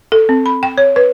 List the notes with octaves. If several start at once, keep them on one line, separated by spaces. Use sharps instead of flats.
A4
C4
B5
G5
C#5
B4